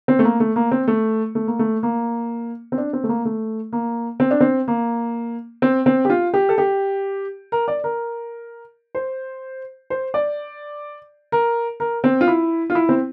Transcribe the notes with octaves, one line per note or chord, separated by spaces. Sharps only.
C4
A3
A#3
A3
A#3
C4
A3
A3
A#3
A3
A#3
C4
D4
C4
A3
A#3
A3
A#3
C4
D4
C4
A#3
C4
C4
G4
F4
G4
A4
G4
A#4
D5
A#4
C5
C5
D5
A#4
A#4
C4
F4
E4
F4
E4
C4